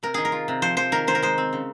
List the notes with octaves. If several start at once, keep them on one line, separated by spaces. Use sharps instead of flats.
C3 A#4
D#3 G#4
A#4
F4
C3
F3 C5
F3 C5
D#3 A#4
D#3 C5
A#4
G#3 C5
C4
C#3